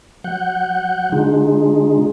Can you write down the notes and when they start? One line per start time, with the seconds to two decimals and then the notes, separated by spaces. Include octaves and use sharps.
0.24 F#3 F#5 F#6 G6
1.12 D3 G#3 D4 D#4 F4 G#4